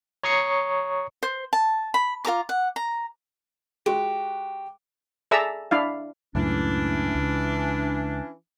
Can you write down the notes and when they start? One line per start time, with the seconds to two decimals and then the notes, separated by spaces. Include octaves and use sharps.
0.23 C#5 A#5 C#6 D#6 C7 C#7
1.23 C5
1.53 A5
1.94 B5
2.25 F4 A#4 A#5 D6
2.49 F#5
2.76 A#5
3.86 G#3 F#4 G4
5.31 G#4 A4 D5 E5 A#5 E6
5.71 D4 E4 F5
6.35 C#2 F#2 A2 E3 C#4 D4
7.15 C#2